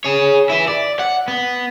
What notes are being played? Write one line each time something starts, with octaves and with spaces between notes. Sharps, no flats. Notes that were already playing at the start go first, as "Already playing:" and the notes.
G#4 C#5
E4 B4
D5
F#5
B3